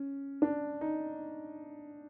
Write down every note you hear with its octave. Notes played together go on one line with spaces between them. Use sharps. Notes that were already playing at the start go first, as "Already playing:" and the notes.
Already playing: C#4
D4
D#4